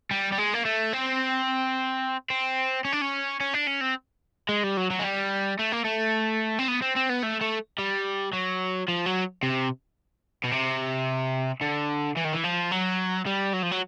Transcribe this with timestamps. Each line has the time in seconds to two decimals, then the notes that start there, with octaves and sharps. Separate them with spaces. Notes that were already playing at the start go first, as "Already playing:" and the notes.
0.11 G3
0.32 G3
0.38 G#3
0.54 A#3
0.66 A3
0.93 C4
2.30 C4
2.85 C#4
2.93 D4
3.02 C#4
3.40 C#4
3.54 D4
3.67 C#4
3.81 C4
4.49 G#3
4.64 G3
4.77 F#3
4.91 F#3
4.99 G#3
5.04 G3
5.59 A3
5.72 A#3
5.84 A3
6.59 C4
6.68 B3
6.82 C4
6.96 C4
7.10 B3
7.23 A3
7.41 A3
7.79 G3
8.33 F#3
8.88 F3
9.06 F#3
9.43 C3
10.44 B2
10.52 C3
11.61 D3
12.16 E3
12.25 D#3
12.33 E3
12.43 F3
12.71 F#3
13.26 G3
13.53 F#3
13.62 F3
13.71 F#3